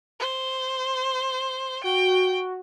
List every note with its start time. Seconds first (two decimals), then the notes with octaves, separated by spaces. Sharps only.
0.20 C5
1.84 F#4 G5